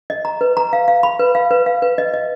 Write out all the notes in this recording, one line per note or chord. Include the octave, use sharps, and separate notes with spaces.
D#5
A#5
B4
A#5
F5
F5
B5
B4
F5
B4
F5
B4
D#5
D#5